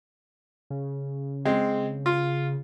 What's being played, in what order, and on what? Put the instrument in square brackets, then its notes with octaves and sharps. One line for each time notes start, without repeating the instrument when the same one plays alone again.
[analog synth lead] C#3
[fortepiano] G#3 C4
F4